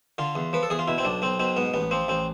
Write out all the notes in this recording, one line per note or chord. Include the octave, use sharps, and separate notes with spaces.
D3 F4
E2
F3 B4
A4
E2 G#4
F4
B2 E4
C4
B1 D4
B1 C4
B2 C4
G#2 B3
A1 B3
F3 C4
A1 C4